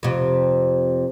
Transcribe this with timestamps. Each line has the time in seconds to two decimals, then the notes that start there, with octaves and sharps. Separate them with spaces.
0.03 F2 C3